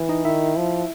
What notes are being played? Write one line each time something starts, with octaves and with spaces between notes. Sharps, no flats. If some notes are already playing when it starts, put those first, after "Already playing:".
Already playing: E3
D#4 D#5
D#3 E4 E5
F3